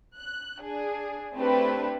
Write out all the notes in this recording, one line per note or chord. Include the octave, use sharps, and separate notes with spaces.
F#6
D4 G#4
A3 C4 D4 E4 G4 B4